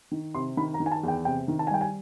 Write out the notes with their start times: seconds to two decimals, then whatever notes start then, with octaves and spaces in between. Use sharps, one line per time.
0.11 D#3
0.34 C3 C6
0.57 D#3 B5
0.74 A#5
0.80 D#3
0.86 G#5
0.92 A5
1.03 E2 G5
1.25 C3 G5
1.48 D#3
1.59 A5
1.67 G#5
1.71 G3 G5
1.81 G#5